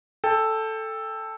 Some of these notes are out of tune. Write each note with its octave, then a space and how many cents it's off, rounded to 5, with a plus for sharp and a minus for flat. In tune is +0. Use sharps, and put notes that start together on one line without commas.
A4 +0 G5 +25